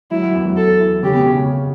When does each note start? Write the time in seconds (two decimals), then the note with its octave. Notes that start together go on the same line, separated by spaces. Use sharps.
0.11 F#2 F#3 E4
0.23 F#2 F#3
0.34 E2 E3
0.45 F#2 F#3
0.57 A4
0.80 E3 E4
1.03 C#3 C#4 G4
1.14 B2 B3
1.25 C#3 C#4
1.37 C#3 C#4